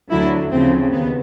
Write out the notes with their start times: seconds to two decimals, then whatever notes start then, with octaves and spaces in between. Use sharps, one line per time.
0.11 D2 D3 F#3 E4
0.51 D2 C#3 F3 C4
0.91 D#2 D#3 B3